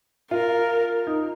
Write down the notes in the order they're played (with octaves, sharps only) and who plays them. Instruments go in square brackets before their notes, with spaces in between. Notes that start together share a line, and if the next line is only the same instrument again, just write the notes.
[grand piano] F4 [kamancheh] A#4
[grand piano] D#4